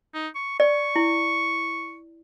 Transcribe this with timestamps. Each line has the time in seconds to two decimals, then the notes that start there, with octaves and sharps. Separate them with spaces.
0.14 D#4
0.35 C#6
0.60 D5 C#6
0.96 E4